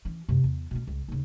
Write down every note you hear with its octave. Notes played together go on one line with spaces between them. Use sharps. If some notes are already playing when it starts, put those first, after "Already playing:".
E3 C#4
F#2 C3
E2
B2 C#4
C#2
D#2 C#3